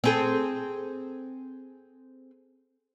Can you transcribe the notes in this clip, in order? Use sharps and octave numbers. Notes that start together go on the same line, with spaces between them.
C4 G#4 A4